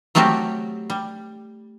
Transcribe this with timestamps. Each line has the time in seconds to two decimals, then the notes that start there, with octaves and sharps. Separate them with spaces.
0.15 F#3 G3 A3 C4 F#4 G4
0.90 G3